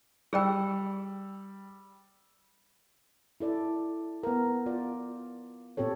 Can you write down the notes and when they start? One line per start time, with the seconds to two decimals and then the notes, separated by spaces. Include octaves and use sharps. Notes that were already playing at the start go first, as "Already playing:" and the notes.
0.33 G3 G#4 D5 G5 E6
3.40 E4 A4 D5
4.23 B3 A#4
4.66 F4 D5
5.77 A#2 C4 G4 A4 C#5